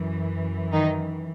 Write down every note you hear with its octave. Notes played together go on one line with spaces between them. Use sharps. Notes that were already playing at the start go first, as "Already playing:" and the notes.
Already playing: F#2 E3
D#3 D#4